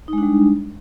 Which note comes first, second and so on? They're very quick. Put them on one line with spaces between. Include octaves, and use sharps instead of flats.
D#4 G#3 D4 G3